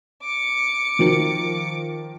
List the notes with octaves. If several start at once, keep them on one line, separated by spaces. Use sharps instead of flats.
D6 C#7
D#3 F3 A#4